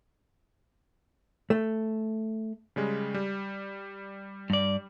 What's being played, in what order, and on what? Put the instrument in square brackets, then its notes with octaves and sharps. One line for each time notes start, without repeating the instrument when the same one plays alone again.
[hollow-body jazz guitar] A3
[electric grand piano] C#3 G3 G#3
G3
[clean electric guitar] G2 D5